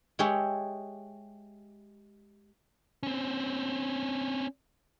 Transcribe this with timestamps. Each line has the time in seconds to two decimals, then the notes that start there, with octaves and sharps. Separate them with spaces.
0.19 G#3 G4 G#4 C#5 E5
3.03 C4 C#4